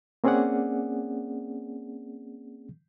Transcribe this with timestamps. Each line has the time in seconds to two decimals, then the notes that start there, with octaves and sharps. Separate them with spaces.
0.24 A#3 C4 C#4 G#4 D5 F#5